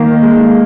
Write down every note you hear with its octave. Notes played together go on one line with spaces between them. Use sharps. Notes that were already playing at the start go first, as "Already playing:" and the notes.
Already playing: D#3 A#3
G#3